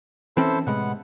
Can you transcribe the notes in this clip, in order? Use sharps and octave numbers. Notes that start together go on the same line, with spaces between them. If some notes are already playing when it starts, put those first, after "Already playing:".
E3 C4 C#4 E4 A4 C5
A2 C3 G#3 B3 F#5